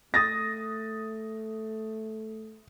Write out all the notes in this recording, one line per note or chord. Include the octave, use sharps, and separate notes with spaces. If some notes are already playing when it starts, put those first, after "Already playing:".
A3 D#6 A6 A#6